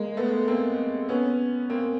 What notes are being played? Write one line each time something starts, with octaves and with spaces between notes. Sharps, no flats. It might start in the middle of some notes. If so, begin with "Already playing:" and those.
Already playing: G#3 A#3
A3 B3
A#3 C4
B3 C#4
A#3 C4